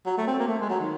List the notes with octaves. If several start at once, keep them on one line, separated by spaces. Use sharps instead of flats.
F#3
A3
C4
A#3
A3
G#3
F#3
D#3